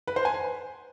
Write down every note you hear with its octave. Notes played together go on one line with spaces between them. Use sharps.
B4
C5
G#5
B4